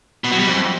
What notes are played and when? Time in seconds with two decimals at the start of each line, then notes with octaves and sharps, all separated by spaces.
0.24 B2
0.32 F#3
0.39 G3
0.47 F2